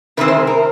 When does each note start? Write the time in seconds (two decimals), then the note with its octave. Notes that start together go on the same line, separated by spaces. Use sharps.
0.17 C3 D#3 G#3 C4 B4
0.28 C5
0.47 A#4